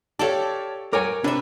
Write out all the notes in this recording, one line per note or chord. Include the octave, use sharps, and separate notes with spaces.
G4 A4 C#5 D5 F5 A5
A#4 C#5 G#5 D6
C3 D4 B4 E5